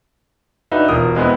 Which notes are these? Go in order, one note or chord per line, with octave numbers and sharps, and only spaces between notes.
D4 D#4 F#4 B4 E5
E1 F4 A#4 D#6
G#3 B3 C4 E4